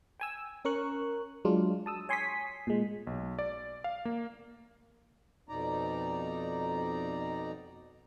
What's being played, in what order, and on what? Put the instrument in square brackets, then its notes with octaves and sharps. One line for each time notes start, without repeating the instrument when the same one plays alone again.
[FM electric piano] G5 G#5 E6
C#4 A#4 C#6 F#6
F#3 G#3 D4 F4
A5 D#6 E6
C#5 G#5 C6 C#6 D#6 B6
A#2 G#3
[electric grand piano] B1
D5
F5
A#3
[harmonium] F2 B2 D#4 D5 A#5